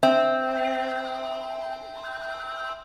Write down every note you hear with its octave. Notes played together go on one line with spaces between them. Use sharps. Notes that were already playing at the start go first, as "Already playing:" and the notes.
C4 E5